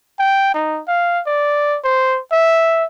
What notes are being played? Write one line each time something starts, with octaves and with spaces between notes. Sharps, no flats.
G5
D#4
F5
D5
C5
E5